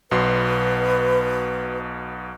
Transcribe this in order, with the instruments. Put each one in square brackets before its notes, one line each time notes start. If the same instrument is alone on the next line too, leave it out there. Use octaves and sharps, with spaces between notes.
[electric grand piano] B1 B2 C6 [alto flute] B4